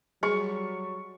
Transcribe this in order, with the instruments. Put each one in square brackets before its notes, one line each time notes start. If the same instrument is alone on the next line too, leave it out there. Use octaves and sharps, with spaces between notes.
[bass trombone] F#3 [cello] G3 [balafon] G#4 [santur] C#6